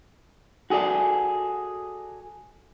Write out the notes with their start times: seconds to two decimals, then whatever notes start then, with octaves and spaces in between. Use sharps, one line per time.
0.70 F#4 G#4 A4 D5